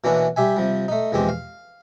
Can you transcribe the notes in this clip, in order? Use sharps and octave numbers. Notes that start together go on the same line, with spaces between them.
B2 E3 A#3 C#4 D4 E4
G3 G4 E5 G#5
C3 F3 G3
A3 D#4
A#1 E2 G#3 C4 G4
F5